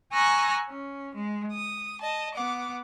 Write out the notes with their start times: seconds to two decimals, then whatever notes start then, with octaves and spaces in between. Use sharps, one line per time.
0.13 G#5 A#5 C#6 E6 F#6 A#6
0.69 C#4
1.15 G#3
1.52 D#6
2.01 D#5 A5
2.34 B3 F#5 D6